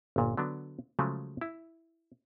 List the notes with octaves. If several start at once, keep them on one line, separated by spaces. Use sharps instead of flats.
G1 A#2
D3 F#3 B3 D4
C#3 F3 F#3 G#3 A3
E4